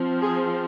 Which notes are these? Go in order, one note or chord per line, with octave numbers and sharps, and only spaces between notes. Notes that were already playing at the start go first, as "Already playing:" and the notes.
Already playing: F3 C4
G#4